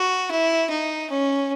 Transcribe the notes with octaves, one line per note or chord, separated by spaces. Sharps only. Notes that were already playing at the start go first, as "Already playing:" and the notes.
Already playing: F#4
E4
D#4
C#4